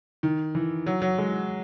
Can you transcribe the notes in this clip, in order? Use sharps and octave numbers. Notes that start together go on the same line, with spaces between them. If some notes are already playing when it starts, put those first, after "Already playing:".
D#3
E3
F#3
F#3
G#3